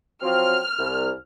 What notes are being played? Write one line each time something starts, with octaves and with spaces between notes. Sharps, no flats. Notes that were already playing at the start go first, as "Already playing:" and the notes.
F3 F#3 C4 F6
C2